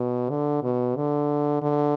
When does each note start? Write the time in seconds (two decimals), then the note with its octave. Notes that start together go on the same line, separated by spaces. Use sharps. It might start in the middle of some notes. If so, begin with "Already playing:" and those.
Already playing: B2
0.30 D3
0.63 B2
0.96 D3
1.62 D3